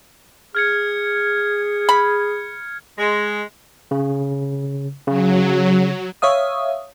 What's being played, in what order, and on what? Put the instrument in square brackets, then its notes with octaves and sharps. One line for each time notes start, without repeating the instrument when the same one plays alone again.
[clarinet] G#4 [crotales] F6 G#6 C#7
[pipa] B5
[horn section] G#3
[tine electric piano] C#3
[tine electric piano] C#3 [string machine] F#3
[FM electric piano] C#5 E5 F5 D#6